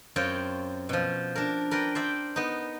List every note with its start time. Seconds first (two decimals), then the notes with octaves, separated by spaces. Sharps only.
0.16 F#2 C4 F4 C#5 G5
0.89 B2 F3
1.35 D4 A#4
1.71 A#4 B4 D5 G5
1.95 C5 D5 E5 G5
2.36 B3 D#4